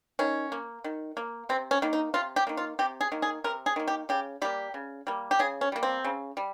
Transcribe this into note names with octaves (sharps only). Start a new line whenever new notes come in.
D#3 C#4
A#3
D#3
A#3
C3 C4
C#4
D#3 A#3
D#4
C3 F4
G4
D#3 A#3
F4
C3 G4
G#4
D#3 A#3
G#4
C3 A#4
G#4
D#3 A#3
G4
C#3 G4
G3 A#3 G4
C#3
G3 A#3
G4
C#3 G#4
C#4
G3 A#3
C4
C#3
G3